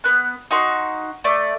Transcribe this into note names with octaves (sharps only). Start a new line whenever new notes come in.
B3 F#6
D#4 F#4 C6
A3 D5